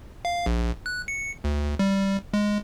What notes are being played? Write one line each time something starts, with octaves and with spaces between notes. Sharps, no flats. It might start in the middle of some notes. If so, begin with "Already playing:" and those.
F5
A#1
F#6
C#7
D2
G3
G#3